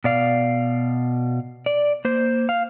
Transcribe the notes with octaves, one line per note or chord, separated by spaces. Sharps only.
B2 D5 F5
D5
A#3 C5
F5